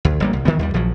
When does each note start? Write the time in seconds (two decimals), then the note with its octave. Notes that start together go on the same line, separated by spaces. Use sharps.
0.05 D2
0.20 A1 G3 A#3
0.33 C2
0.45 D#3 E3 B3
0.59 D#2 G3
0.74 A#1 F3 F#3